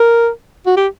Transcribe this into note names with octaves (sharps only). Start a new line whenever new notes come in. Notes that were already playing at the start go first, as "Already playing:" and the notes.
Already playing: A#4
F#4
G4